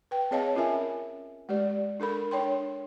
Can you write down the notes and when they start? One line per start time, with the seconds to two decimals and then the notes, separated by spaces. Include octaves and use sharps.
0.11 B4 G5
0.31 C4 G#4 C#5 D#5 F5 A5
0.56 C#4 F4 A#4 E5 G#5
1.49 G#3 G4 D5
2.00 D4 A4 A#4 B5
2.31 D4 C#5 G5 C6